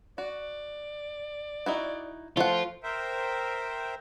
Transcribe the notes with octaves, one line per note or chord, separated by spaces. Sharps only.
F#4 D5
D#4 E4 F#4
F3 A3 F4 F#5
A#4 C5 E5 G5